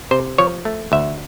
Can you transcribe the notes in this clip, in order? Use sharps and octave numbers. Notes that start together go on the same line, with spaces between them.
C3 C5
F3 C#5
A3
D2 E5